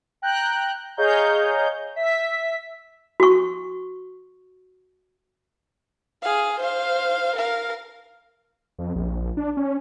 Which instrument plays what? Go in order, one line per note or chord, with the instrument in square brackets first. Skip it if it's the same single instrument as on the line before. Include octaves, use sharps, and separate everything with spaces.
[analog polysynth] G5 A#5 F#6 G6
G#4 C#5 D#5 F5 A#5 G6
E5 B6
[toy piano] F#4 C#6
[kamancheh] G#4 F5
C5 F5
A#4 F5
[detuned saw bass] F2
A#1
D4
C#4